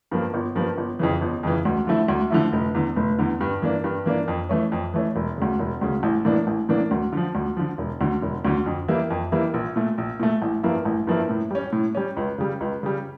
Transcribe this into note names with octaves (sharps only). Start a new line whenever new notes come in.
G2 F3 A#3
G1
G2 F3 A#3
G1
F2 C#3 E3
G1
F2 C#3 E3
D2
D3 F3 A3 E4
D2
D3 F3 A3 E4
F1
E2 D3
F1
E2 D3
G2
E3 A#3 D4
G2
E3 A#3 D4
F2
E3 A3 C#4
F2
E3 A3 C#4
E1
D2 C#3
E1
D2 C#3
A1
A2 E3 A#3 D4
A1
A2 E3 A#3 D4
D2
D3 F3
D2
D3 F3
E1
D2 D3
E1
D2 D3
F2
E3 G3 A#3 E4
F2
E3 G3 A#3 E4
A#1
A#2 A3
A#1
A#2 A3
A1
G2 F3 A#3 E4
A1
G2 F3 A#3 E4
A2
G3 C#4
A2
G3 C#4
C#2
C#3 G3
C#2
C#3 G3